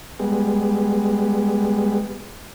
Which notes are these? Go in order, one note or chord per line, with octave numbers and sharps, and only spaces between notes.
G3 G#3 B3